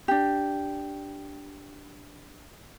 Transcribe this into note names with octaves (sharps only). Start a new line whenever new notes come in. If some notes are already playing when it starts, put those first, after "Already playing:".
D4 G4